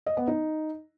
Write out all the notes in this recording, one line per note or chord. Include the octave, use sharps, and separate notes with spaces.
D#5
B3
D#4